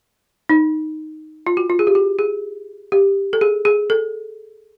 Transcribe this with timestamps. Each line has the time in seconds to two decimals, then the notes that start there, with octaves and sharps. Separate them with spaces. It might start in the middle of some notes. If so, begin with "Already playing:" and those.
0.49 D#4
1.47 F4
1.57 F#4
1.70 F4
1.79 G#4
1.87 G4
1.95 F#4
2.19 G#4
2.92 G4
3.33 A4
3.41 G#4
3.65 G#4
3.90 A4